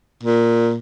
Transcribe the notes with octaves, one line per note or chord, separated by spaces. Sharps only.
A#2